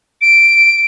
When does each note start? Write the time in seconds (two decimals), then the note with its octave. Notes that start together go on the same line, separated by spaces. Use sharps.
0.21 D7